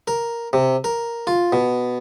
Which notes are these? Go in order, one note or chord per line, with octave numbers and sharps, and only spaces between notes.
A#4
C3
A#4
F4
B2